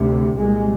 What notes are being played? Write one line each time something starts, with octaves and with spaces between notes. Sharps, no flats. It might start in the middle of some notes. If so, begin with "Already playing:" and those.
Already playing: D2 C3
C2 A#2 G#3